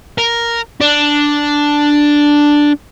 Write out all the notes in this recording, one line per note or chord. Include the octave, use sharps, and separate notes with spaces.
A#4
D4